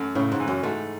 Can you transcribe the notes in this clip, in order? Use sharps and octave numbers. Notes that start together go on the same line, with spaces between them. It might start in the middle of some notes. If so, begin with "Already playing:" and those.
Already playing: F#2 A3
A2 C#3
G#2
E3
F#2
G#2 A3